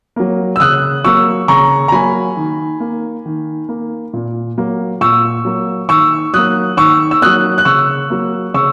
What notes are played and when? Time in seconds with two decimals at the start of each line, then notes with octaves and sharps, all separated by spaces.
0.16 F#3 A#3
0.56 E6
0.60 C#3 D#6 F#6
1.04 F#3 A#3 C#6 E6
1.48 C#3 A#5 C#6
1.88 A#5
1.92 F#3 A#3 G#5 B5
2.37 D#3
2.80 A#3
3.26 D#3
3.69 A#3
4.13 A#2
4.58 F#3 A#3
5.01 A#2 C#6 E6
5.45 F#3 A#3
5.89 D#3 C#6 E6
6.34 F#3 A#3 D#6 F#6
6.77 D#3 C#6 E6
7.11 E6
7.22 F#3 A#3 D#6 F#6
7.58 F#6
7.65 C#3 C#6 E6
8.10 F#3 A#3
8.54 C#3 C#6 E6